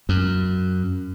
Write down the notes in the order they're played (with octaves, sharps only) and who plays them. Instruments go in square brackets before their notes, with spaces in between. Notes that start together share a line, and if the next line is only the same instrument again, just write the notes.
[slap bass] F#2